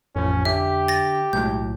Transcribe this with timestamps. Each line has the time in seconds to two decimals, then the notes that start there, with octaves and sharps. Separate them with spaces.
0.16 A1 F2 F3 C#4
0.45 D3 G4 E5
0.88 A6 A#6
1.33 B1 A2 F#3 G#3 G6